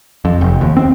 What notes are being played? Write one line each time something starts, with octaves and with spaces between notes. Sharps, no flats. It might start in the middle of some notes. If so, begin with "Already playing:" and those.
F2
F1
D#2
C4